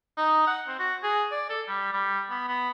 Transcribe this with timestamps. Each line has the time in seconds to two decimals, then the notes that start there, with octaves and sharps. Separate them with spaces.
0.17 D#4
0.47 F#5
0.68 C4
0.79 F#4
1.03 G#4
1.32 D5
1.49 A4
1.68 G3
1.93 G3
2.30 B3
2.48 B3